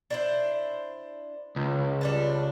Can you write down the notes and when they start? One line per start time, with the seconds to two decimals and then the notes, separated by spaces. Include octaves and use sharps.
0.10 D4 E4 C5
1.56 C#2
2.01 G3 D4 A5